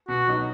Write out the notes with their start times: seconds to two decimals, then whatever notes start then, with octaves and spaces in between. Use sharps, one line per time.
0.08 B2 F#4
0.27 F#3 B3 D#4